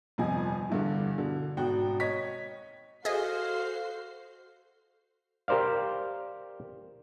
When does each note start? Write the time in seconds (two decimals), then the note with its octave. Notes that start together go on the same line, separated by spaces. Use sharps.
0.18 G1 F2 C3 D#5 G#5
0.70 E2 G2 D3
1.18 B2 D3
1.57 G#1 B2 F#4 G5
2.00 C#5 D#5 B6
3.05 F#4 G#4 A4 C5 D#5 F5 C7
5.48 G4 A#4 C5 D5 F5